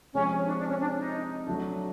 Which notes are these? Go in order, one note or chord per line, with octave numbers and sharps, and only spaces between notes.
C3 F3 G#3 C4 C#4
D4
D4
C#4
D4
D#4
F#3 A3 D4